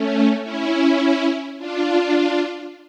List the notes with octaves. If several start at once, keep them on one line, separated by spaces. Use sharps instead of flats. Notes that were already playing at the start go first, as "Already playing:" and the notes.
Already playing: A3 C#4
C#4 E4
D4 F4